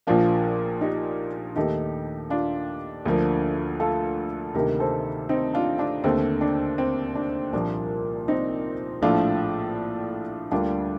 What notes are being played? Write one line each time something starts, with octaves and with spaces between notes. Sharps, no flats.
A#1 A#2 F3 A#3 D4 F4
D#4 G4
D#2 D#3 A3 D#4 G4
D4 F4
D2 D3 F3 A#3
F4 A4
D2 C3 D#3 A#3 G4 A#4
A4 C5
C4 D#4
D4 F4
D4
D#2 D3 A3 C4
D4
C4
D4
C2 A#2 F3 A#3 D4
C4 D#4
A#1 A2 F3 A3 D4 F4
D2 D3 G3 A#3 D4 F4